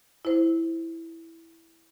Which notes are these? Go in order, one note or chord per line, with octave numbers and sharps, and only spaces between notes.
E4 C5